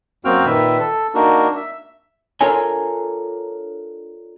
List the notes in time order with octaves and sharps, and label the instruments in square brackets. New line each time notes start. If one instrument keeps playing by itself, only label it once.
[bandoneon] F#2 A#3 C4 F#4 G5 F6
A#2 D#3 B4 E5
A4
A#3 D4 D#4 F#4 A#4
E5
[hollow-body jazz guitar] D4 F4 A4 A#4 C#5 G#5